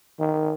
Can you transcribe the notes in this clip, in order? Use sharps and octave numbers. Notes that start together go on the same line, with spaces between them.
D#3